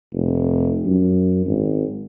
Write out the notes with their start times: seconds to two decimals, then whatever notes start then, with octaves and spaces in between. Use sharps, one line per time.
0.13 F1
0.85 F#2
1.46 G#1